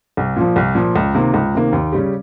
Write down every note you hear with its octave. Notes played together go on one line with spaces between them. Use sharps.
C2
A#2 F3
C2
A#2 F3
C#2
C3 D#3 A#3
C#2
C3 D#3 A#3
D#2
C#3 G3 C#4 G4